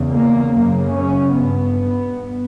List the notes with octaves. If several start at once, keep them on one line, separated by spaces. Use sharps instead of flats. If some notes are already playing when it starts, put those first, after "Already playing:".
Already playing: E2 C#3
A#3
F#2 C#3 A#3
C#4
G2 B3